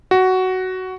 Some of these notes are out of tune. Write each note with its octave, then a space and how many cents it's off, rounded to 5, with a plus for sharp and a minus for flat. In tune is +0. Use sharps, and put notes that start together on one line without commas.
F#4 +10